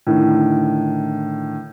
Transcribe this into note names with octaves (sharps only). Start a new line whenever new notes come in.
A2 D3 D#3